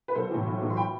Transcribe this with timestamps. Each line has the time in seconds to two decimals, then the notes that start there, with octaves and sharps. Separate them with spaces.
0.08 B4
0.15 B1 A4 C5
0.31 A2 E3
0.46 B1
0.62 A2 E3
0.70 C6
0.77 G5 B5